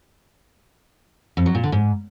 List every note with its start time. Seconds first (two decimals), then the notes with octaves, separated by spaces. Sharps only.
1.37 F2
1.46 F#3
1.55 A#2
1.63 D3
1.72 G#2